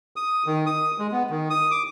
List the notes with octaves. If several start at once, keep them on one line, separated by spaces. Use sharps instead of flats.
D#6
D#3
D#6
G#3
B3
D#3
D#6
D6